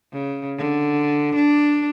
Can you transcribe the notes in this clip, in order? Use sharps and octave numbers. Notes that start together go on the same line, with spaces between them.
C#3
D3
D4